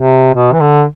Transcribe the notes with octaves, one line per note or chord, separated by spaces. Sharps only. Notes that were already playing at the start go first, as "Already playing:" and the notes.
Already playing: C3
B2
E3
D3